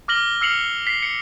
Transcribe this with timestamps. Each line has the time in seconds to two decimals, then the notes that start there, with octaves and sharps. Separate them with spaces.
0.08 D6 F6 A#6 F#7 G7
0.41 E6 F6 C7 C#7 F7 F#7
0.87 B6 C7
1.03 C#7